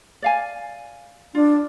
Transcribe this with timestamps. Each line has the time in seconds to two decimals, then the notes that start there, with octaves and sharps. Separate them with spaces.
0.22 D5 F5 G#5
1.35 D4 F4